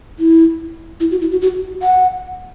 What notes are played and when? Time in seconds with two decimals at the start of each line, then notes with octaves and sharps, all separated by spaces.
0.19 E4
1.00 E4
1.11 F#4
1.21 E4
1.31 F#4
1.42 F#4
1.82 F#5